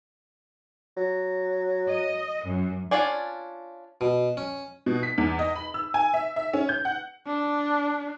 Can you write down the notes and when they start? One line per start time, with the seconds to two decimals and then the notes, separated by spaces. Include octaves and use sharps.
0.97 F#3
1.89 D#5
2.45 F#2
2.91 C#4 D4 F4 D5 G#5
4.01 B2
4.37 C#4
4.86 B2
5.03 B6
5.18 E2
5.39 D#5
5.56 B5
5.74 E6
5.94 G#5
6.14 E5
6.36 E5
6.53 C#4
6.69 G6
6.85 F#5
7.27 D4